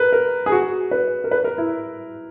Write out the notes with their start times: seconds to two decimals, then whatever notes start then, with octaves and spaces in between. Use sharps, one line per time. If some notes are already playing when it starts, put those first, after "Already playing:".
Already playing: A#4 B4
0.12 A#4
0.46 G#4
0.52 F#4
0.91 B4
1.24 A#4
1.31 B4
1.44 A#4
1.58 E4